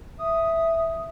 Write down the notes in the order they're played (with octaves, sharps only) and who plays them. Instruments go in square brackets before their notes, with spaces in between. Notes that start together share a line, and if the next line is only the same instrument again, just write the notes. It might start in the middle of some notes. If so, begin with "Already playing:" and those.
[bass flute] E5 [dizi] D#6